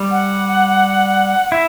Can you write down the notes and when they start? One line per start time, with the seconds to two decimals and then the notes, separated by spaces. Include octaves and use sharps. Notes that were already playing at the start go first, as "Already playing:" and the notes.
Already playing: G3
0.11 F#5
1.52 E4 E5